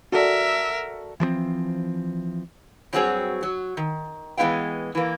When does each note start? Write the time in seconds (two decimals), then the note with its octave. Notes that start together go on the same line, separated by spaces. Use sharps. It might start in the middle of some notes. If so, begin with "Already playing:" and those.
0.12 F#4 A4 A#4 D5 E5
1.20 E3 F3 G#3 C4
2.93 G2 F#3 C4 F#4 G#4 C#5
3.43 F#3
3.77 D#3
4.37 E3 G#3 B3 E4 F5 G5
4.95 E3 A#3